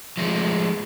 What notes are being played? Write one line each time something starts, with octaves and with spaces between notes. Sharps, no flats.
F3 G#3 A3